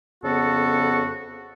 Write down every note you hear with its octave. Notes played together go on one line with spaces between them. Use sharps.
F2 C#3 B3 F#4 A4